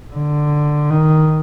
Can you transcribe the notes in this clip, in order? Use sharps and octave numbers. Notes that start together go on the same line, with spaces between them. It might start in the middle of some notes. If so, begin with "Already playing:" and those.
D3
D#3